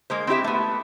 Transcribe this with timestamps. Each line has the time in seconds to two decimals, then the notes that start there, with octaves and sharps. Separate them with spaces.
0.10 G#3 A#3 C5
0.27 C4 E4 G4 E5
0.44 A3 B3